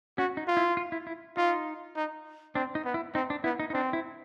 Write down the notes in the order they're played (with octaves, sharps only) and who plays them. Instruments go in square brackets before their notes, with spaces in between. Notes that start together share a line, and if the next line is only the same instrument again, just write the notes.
[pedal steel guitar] C#4 [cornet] F#4
[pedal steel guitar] D#4
[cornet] F4
[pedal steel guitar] E4
F4
E4
E4
[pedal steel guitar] D#4 [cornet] F4
[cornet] D#4
[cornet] C4 [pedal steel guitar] D4
[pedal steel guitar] D#4
[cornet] B3
[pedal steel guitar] E4
[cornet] C4 [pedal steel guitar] D#4
[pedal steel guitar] D4
[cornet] B3 [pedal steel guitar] E4
[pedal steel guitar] D#4
D#4
[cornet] C4 [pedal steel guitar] D4
[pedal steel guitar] E4